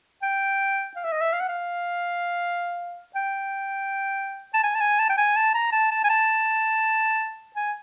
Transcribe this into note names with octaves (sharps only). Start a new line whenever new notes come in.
G5
F5
E5
D#5
E5
F5
F#5
F5
G5
A5
G#5
A5
G#5
A5
G5
G#5
A5
A#5
A5
A5
G#5
A5
G#5